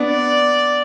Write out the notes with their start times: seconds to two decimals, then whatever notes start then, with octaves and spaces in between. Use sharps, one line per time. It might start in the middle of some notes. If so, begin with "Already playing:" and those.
Already playing: B3 D4 D5